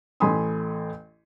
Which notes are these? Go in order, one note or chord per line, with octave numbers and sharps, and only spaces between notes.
A1 A3 G#5 B5 C6 D#6